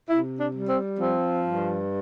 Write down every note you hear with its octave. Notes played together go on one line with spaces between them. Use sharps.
C3 E4
D4
G3
C4
F3 C4
G2